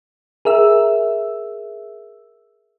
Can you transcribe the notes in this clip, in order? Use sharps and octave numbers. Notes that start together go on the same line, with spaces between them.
G#4 A#4 E5 E6